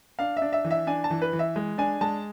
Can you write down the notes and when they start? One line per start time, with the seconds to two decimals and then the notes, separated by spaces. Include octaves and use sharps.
0.19 D4 F5
0.37 E5
0.42 D4
0.53 E5
0.65 E3
0.71 E5
0.87 D4 G#5
1.04 A5
1.11 E3
1.22 B4
1.33 E3
1.39 E5
1.56 G#3
1.78 D4 G#5
2.01 G#3 A5